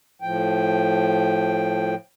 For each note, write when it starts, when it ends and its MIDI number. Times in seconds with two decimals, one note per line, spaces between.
0.22 1.95 45
0.22 1.95 53
0.22 1.95 79